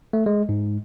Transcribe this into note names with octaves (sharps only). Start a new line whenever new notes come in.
A3
G#3
G#2